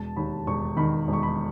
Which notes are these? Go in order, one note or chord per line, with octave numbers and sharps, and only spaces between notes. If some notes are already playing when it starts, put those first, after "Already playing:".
Already playing: E1 A5
D#2 B5
E1 C#6
D#3 B5
E1
C#6
B5